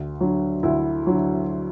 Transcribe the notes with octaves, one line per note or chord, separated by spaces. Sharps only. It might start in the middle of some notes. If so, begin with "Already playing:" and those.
Already playing: D2
D3 F#3
D2 E4
D3 F#3